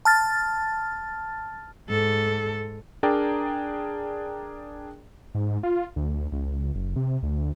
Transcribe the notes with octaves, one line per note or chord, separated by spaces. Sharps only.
A5 F6 A6
G#2 A4
D4 G#4 A#4 D5 G5 A#5
G#2
F4
D2
C#2
F#1
C3
D2